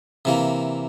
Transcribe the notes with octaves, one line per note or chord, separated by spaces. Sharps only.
C3 E3 A#3